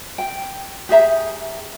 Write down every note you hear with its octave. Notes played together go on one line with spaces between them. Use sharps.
G5
G4 G#4 E5 A#5